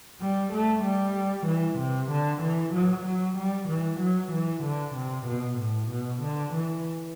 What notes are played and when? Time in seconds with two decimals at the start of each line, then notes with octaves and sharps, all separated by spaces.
0.21 G3
0.53 A3
0.84 G3
1.48 E3
1.80 C3
2.12 D3
2.43 E3
2.74 F#3
3.06 F#3
3.38 G3
3.69 E3
4.01 F#3
4.32 E3
4.64 D3
4.96 C3
5.28 B2
5.59 A2
5.91 B2
6.22 D3
6.54 E3